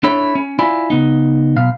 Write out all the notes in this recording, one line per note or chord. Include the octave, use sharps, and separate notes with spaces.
D4 E4 A4 C#5
C#4
E4 F4 D5 E5 G#5 B5
C#3 B3 D#4
B1 B2 F5